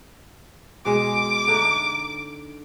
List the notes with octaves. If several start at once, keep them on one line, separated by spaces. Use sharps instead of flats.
B2 G#3 D6
D3 A3 D#4